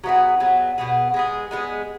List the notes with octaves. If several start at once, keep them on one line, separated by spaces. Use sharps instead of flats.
F#3 B3 E4 G#4
F#3 B3 G#4
B2 B3 G#4
G#3 B3 G#4
G#3 B3 G#4